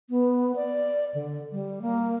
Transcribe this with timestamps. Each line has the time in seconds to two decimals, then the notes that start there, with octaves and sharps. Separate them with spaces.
0.10 B3
0.56 D5
1.14 D3
1.52 G3
1.82 A#3